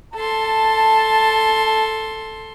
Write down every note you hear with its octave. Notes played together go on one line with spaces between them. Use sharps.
A4 A5 C6